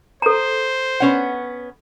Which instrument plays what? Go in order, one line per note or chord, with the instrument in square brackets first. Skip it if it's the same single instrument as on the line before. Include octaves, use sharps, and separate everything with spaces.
[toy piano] A4 A#5 [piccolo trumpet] C5
[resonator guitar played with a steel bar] B3 C#4 F#5